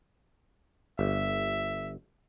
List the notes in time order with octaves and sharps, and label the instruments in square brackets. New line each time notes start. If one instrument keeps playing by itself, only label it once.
[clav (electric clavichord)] G1 [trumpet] E5